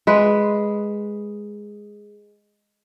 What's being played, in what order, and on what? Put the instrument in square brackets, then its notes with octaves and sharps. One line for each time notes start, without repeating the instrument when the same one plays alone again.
[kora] G#3 B4 E5